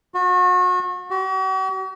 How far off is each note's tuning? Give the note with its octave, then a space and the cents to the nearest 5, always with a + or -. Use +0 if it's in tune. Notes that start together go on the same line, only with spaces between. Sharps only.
F#4 -35
F#4 +45